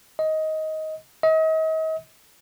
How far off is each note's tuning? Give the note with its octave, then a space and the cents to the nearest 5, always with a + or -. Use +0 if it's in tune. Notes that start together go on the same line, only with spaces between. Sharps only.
D#5 +15
D#5 +40